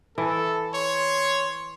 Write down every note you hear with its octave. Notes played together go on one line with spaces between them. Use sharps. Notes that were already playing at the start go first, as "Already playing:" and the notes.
E3 A4
C#5 C6